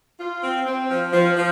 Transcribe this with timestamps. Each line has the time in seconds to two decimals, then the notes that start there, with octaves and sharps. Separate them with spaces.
0.20 F4
0.43 C4
0.66 C4
0.89 F3
1.13 F3
1.37 F3